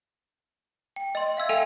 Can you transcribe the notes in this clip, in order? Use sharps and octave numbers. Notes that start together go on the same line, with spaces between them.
G5
D#5 C6
E5 F5 E6 G#6
A4 E5 F5 G5 G#5 D#7